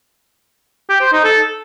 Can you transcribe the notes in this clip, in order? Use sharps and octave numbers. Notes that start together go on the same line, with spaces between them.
G4
C5
D#4
A4